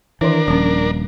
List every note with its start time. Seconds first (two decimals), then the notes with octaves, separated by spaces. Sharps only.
0.21 D#3 E3 D4 A#4 C#5
0.48 D#1 F3 C#4